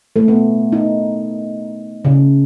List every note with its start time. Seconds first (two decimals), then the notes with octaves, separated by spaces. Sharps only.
0.16 A3
0.28 B3
0.72 D#4
2.05 C#3